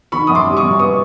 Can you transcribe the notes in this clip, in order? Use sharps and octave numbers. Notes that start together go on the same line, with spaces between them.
D#3 B5 C#6
F#2 D#6
C6 D6
G3
C#6 D#6
F#2
B3 C#6 D#6